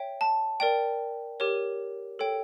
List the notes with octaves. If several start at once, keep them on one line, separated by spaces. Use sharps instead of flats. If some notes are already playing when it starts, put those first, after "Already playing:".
Already playing: C#5 E5 G5
A5
A#4 D5 G5
G4 A#4 C#5
A4 C#5 G5